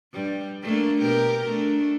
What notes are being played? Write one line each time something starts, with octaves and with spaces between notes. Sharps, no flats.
G2 G3
A3 A#3 D4
B2 G4 A#4
A3 D4